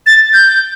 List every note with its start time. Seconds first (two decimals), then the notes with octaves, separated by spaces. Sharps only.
0.06 A6
0.33 G6